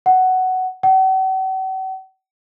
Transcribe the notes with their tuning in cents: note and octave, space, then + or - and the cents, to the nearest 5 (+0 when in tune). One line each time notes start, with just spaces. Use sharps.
F#5 +10
F#5 +45